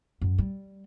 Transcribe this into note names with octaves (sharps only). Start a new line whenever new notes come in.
F#2
G3